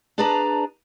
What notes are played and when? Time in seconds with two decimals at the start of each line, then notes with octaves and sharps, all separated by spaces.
0.18 D4 G#4 B4 D5 A5 A#5